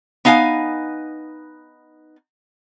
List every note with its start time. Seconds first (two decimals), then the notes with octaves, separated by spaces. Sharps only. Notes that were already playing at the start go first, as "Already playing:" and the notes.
0.25 B3 D#4 F5 F#5 G#5